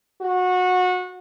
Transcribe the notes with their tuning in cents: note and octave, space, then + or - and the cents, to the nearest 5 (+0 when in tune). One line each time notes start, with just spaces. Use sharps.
F#4 -25